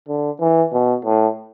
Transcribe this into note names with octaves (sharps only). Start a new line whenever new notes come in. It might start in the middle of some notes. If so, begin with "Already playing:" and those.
D3
E3
B2
A2